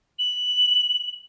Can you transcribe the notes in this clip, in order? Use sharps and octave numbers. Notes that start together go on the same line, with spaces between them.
F#7